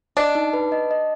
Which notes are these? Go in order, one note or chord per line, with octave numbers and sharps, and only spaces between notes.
D4 D#5
D#4
B4
D#5
D#5